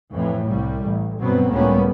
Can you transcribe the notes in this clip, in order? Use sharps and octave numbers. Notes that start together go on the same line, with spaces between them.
F2 A2 E3
C2 G3
A1
G1 B2 F#3 B3 C4
C#2 A2 G3 A#3 B3 C#4